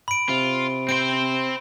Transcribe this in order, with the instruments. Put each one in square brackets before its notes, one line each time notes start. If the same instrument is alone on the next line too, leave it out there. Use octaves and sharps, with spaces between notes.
[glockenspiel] B5 D7
[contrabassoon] C3 [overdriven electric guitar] F4
[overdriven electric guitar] C4 C5 [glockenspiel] D7